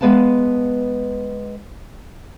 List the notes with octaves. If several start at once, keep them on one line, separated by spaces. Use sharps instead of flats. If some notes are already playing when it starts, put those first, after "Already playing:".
G#3 B3 B4 F5 A5